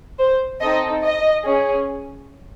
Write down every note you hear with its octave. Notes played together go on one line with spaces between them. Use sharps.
C5
C4 D#4 A4 D#5
D#5
C#4 G#4